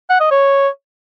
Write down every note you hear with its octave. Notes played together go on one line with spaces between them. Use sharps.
F#5
D#5
C#5